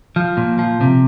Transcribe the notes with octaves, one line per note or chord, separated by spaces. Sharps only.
F3
A#2
F3
C3